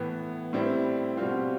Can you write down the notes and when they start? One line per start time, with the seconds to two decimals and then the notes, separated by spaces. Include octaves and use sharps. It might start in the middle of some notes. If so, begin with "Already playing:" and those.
Already playing: A2 E3 B3
0.53 A2 G3 C4 E4
1.17 B2 G3 C4 F4